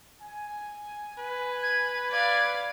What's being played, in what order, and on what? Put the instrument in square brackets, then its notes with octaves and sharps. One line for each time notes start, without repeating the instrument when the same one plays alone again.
[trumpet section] G#5
[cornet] B4
[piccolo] G#6
[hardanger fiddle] D5 F5 [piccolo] G#6